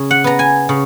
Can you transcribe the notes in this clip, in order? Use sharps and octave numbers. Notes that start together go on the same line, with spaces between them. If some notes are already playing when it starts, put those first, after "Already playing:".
Already playing: C#3
F#5
B3 A#5
G#5
C#3